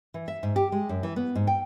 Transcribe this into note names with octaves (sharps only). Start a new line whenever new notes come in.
E3
E5
G#2
G4
G#3
F#2
E3
B3
G#2
G5